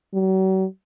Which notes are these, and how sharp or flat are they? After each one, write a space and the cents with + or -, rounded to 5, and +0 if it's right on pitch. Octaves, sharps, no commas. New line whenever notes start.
F#3 +40